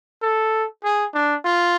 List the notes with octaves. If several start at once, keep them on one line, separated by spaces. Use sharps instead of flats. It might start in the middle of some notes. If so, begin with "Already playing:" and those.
A4
G#4
D4
F4